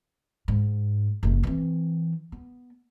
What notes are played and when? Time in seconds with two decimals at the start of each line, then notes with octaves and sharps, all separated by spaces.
0.48 G#2
1.23 F#1 C2
1.43 E3 C4
2.32 B3